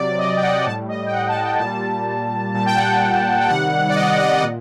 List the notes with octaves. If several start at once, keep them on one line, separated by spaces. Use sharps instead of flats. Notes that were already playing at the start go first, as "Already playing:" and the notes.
Already playing: C3 F#3 D5
D#5
G5
F#5
A2 G3 A5
D#5
G5
F#5
A5
G5
A#2 A5
G3
A#2 G3 A5
G5
F#5
G5
G5
C3 D#3 G3 F#5
D5
D#5
D#5
A#2